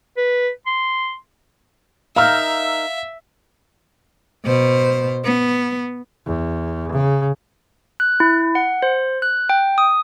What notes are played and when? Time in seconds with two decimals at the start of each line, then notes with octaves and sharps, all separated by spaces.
0.17 B4
0.66 C6
2.16 D#4 A#4 E5 F5 E6
4.46 B2 C5
5.25 B3
6.26 E2
6.92 C#3
8.00 F#6
8.20 E4
8.55 F#5
8.82 C5
9.22 F#6
9.49 G5
9.78 D#6